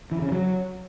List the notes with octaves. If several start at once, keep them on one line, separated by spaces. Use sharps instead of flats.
E3
C#3
F#3